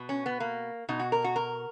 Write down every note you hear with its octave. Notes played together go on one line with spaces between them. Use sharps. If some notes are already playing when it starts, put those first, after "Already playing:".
Already playing: B2
C#4
B3
A#3
B2 D#4
F#4
A#4
F#4
A#4